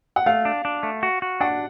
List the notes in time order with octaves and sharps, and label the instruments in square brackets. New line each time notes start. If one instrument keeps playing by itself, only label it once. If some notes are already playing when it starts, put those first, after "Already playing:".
[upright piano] F#5
[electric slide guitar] A3 [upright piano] F5
[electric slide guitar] D4
D4
A3
F#4
F#4
[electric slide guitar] D4 [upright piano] F#5